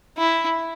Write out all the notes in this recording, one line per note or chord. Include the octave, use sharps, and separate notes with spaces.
E4